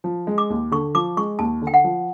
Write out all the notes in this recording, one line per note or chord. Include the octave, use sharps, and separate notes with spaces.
F3
G#3
D6
D#2
D3 C#6
F3 D6
G#3 C#6
D#2 A5
D3
G5
F#5
F3